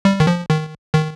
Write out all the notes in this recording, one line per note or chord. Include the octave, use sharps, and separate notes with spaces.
G3
D#3
F3
D#3
D#3